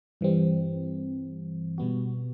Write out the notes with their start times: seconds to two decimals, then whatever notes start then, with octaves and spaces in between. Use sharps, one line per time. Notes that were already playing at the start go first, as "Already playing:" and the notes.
0.21 G2 E3 G3 C4
1.78 B2 G3 B3 F#4